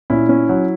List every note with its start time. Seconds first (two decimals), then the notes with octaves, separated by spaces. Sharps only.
0.10 A#2 C#4 E4
0.29 C#4
0.49 F#3